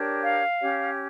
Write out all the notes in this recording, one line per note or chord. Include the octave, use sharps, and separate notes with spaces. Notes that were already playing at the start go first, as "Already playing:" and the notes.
Already playing: D4 G4 A#4 C#5
F5
C#4 G4 C#5